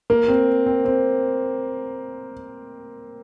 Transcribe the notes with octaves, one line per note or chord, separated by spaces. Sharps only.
A#3
C4
C4
C4